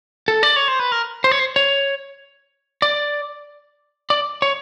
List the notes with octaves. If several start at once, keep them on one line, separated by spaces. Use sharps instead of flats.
A4
D5
C#5
C5
B4
A#4
C5
C#5
C5
C#5
D5
D5
C#5